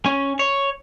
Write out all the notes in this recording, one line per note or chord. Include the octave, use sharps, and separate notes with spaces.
C#4
C#5